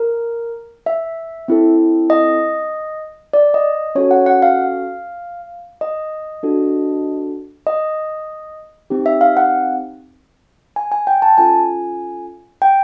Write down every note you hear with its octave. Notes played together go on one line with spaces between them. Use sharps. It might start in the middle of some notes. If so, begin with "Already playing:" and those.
Already playing: A#4
E5
C4 E4 A4
D#5
D5
D#5
C#4 F#4 A4 C#5
F#5
F#5
F5
D#5
D4 F#4 A4
D#5
C4 D#4 G4
E5
F5
F#5
G#5
G#5
G5
A5
C#4 F4 A4 G#5
G5